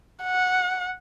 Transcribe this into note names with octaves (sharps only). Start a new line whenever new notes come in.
F#5